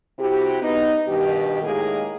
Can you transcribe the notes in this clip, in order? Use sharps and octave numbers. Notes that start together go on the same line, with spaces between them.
C3 E4 F#4 G4
B3 D#4
G2 B2 D#3 G4
A2 D#3 G#3 A#3 G#4